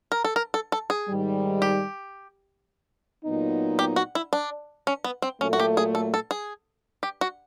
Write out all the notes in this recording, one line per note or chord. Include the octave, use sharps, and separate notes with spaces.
A#4
A4
A#4
A4
A4
G#4
G#2 D#3 G3
G4
A#2 F#3 B3 D#4
G4
F#4
E4
D4
C#4
B3
C4
A#2 F#3 A3 C#4
F#4
G4
G#4
A4
A4
G#4
G4
F#4